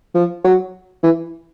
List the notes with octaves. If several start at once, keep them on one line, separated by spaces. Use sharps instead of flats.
F3
F#3
E3